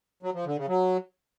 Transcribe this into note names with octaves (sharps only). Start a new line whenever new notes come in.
F#3
F3
D3
C#3
F#3